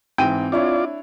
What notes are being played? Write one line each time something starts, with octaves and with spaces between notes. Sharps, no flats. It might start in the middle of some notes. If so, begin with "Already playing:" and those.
G#2 E3 C4 G5 D#7
D4 E4 F4 C#5 D5